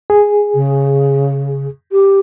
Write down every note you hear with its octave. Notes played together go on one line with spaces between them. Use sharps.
G#4
C#3
G4